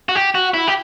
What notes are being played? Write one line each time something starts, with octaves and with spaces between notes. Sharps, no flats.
F#4
G4
F#4
E4
G4